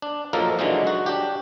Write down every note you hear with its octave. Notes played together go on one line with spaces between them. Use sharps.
D4
F3 F#3 A#3 D#4 A4 A#4
D3 E3 F#3 G#3 D#4
F#4
D4 G4